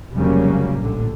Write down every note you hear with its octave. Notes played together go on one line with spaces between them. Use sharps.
F1 C#3 F#3 G3 A#3 C#4
A#1 A2 D3